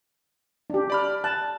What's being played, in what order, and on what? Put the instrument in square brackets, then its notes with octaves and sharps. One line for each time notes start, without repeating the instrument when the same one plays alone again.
[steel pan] D4 G4
[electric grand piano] D5 B5 F6
[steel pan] A5 [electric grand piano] F#6